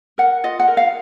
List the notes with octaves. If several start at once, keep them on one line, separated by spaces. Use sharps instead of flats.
A#4 F#5
F4 D#5
F#5
A#4
F5